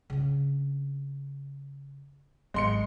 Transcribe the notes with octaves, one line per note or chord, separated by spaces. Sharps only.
C#3 D4
G#1 G#3 C6 C#7